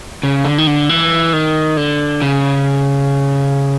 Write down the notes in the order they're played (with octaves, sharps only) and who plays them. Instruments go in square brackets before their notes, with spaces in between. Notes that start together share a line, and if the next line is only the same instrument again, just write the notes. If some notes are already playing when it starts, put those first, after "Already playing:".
[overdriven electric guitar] C#3
D3
D#3
D3
E3
D#3
D3
C#3